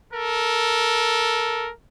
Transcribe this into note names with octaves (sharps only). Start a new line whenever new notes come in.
A4 A#4